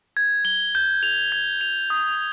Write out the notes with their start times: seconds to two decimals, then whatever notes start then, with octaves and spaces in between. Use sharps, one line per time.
0.17 G#6
0.45 G7
0.75 G6
1.03 F7
1.32 G#6
1.61 F7
1.90 D#6